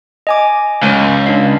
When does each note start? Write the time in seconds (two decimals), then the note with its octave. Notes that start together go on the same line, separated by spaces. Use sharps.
0.27 D#5 G#5 D6
0.83 C#2
1.26 D4 F5